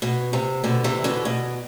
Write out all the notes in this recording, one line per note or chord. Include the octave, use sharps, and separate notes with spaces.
B2
C3
B2 D3
C3 E3
B2 D3
B2